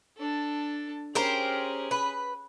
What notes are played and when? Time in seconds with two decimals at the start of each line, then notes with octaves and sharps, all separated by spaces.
0.18 D4 A4
1.15 C#4 G4 G#4 A#4 C5
1.91 B4